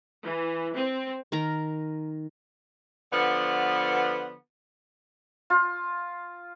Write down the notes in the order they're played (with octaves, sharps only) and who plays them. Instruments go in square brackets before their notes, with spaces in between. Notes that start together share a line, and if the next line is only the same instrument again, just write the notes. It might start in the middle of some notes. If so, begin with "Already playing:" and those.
[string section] E3
C4
[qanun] D#3 A#4 A#5
[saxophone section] D3 F3 B3
[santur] F4